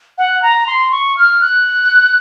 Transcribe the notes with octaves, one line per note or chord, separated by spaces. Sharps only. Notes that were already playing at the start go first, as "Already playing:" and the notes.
F#5
A#5
C6
C#6
F6
F#6